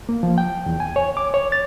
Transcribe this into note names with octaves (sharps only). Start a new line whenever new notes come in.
A#3
F3
G5
E2
G#5
C#5
D6
C#5
A6